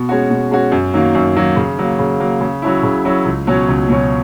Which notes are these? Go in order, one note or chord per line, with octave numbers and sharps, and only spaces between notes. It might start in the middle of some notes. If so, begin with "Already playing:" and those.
Already playing: B2
G#3 C#4 F#4
B2
G#3 C#4 F#4
F#2
D#3 F#3 A#3
F#2
D#3 F#3 A#3
C#3
F#3 A#3
C#3
F#3 A#3
C#3
F#3 C#4 E4
C#3
F#3 C#4 E4
C#2
B2 F#3 C#4
C#2
B2 F#3 C#4